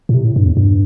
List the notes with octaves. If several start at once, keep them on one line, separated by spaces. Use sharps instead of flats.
A2
C3
A2
G2
E2
G2